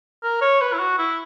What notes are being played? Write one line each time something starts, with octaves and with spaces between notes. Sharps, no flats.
A#4
C#5
B4
E4
F#4
E4